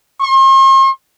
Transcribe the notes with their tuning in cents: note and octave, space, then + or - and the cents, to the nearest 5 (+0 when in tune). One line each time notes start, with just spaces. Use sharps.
C6 +45